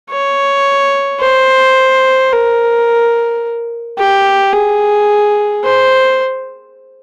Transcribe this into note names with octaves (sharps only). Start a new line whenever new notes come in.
C#5
C5
A#4
G4
G#4
C5